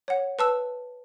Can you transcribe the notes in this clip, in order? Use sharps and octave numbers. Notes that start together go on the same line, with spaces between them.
C#5 F#5
B4 A5 E6